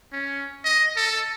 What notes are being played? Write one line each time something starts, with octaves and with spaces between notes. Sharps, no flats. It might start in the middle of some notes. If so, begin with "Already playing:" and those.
C#4
D#5
A4